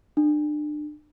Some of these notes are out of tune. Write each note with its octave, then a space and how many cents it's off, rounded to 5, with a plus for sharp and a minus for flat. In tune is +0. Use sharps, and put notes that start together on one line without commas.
D4 +30